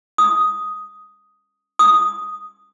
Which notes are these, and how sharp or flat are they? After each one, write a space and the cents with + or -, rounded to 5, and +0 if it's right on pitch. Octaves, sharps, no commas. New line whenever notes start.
D#6 +5
D#6 +0